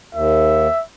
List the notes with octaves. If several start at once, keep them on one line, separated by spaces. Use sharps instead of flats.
D#2 E5